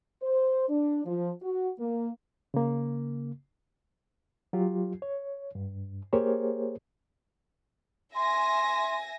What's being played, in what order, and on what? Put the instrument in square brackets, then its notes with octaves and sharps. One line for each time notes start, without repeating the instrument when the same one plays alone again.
[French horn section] C5
D4
F3
F#4
A#3
[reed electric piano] C#3 A#3
F#3 F4 G4
C#5
G2
A#3 G4 G#4 A#4 C5 C#5
[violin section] E5 G#5 A#6 [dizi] C6